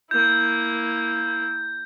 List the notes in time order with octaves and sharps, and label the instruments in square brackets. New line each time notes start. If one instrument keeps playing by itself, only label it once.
[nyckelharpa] A#3 E4 [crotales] G6